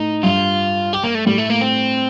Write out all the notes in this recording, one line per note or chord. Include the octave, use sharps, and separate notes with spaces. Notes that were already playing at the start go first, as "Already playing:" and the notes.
Already playing: A2 D#4
G2 F4
G4
A#3
A3
A2 G3
A3
A#3
C4